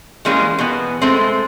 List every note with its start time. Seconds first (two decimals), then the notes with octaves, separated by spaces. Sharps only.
0.25 E3 G3 G#3 A#3 C#4 G#4
0.59 B2 E3 B3
1.02 G#3 A3 C4